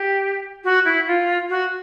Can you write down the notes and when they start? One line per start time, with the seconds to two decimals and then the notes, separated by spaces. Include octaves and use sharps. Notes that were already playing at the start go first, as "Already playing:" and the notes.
Already playing: G4
0.64 F#4
0.85 E4
1.07 F4
1.50 F#4